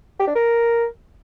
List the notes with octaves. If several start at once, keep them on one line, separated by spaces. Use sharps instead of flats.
G4
D4
A#4